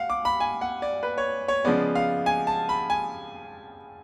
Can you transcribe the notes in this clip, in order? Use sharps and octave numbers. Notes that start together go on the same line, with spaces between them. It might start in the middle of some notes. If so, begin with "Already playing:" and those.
Already playing: F5 F#5
D6
B5
G#5
F#5
D5
B4
C#5
C#5
C#3 F3 G#3 B3 D5
F5
G#5
A5
B5
G#5